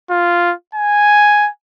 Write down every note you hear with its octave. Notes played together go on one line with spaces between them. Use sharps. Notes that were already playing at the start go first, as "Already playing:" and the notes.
F4
G#5